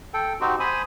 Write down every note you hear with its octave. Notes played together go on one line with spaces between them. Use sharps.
A4 G5
C4 D#4 F#4 G4
C5 G#5 B5 D#6